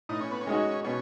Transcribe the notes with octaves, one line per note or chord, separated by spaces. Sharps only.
A2 D#4
C#4
B3
C#4
G#3 D#4 F#4
B2 C#4